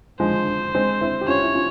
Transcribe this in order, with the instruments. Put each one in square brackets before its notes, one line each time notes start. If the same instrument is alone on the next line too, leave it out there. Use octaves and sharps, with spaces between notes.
[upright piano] F3 G#3 [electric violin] C5
[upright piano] G#3 C4
C4 E4
G4
[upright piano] C#4 F4 [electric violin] C#5
[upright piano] E4
C#4 F4